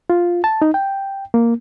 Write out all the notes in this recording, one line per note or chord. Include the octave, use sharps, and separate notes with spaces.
F4
A5
D#4
G5
A#3